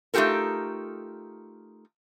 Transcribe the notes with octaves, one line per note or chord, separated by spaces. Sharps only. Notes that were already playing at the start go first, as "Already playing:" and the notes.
A3 D#4 F4 G4 A4 A#4